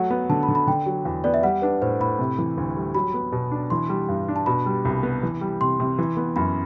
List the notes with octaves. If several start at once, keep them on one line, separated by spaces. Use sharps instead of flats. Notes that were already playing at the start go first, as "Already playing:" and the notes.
Already playing: F#3 A3 F#5
B3
D3 A5
B5
D3
B5
D3 G5
F#3
E2
B3 D5
E5
G3 F#5
D4 B4
A2 C5
A2 B5
C3
E3
D2
G3
F#3 B5
B3
B2
D4
E3 C6
G3
G2
D4
A5
B2 B5
G3
C2
B3
E3
G3
C3 C6
C3
E3
B3
F#2 B5